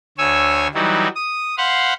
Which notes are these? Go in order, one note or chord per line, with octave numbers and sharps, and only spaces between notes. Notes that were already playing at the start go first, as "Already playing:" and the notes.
D2 C#5 G#5 E6
E3 F#3 G3 D#4 F#4
D#6
C5 F5 F#5 B5 C6